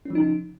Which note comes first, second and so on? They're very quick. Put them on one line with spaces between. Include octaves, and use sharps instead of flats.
C#4 F3 D#4 C#3